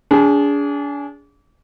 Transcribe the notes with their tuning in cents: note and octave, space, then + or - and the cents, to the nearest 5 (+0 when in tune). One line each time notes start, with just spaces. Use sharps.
D4 -35 G#4 -10